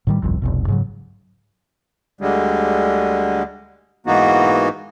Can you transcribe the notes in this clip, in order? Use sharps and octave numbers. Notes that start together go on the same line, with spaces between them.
A2 D#3 G3
G1 C2 F2
F1 C2 B2
G#2 C#3 F#3
D2 D3 G3 G#3
G#2 E3 A#3 B3 D#4 F#4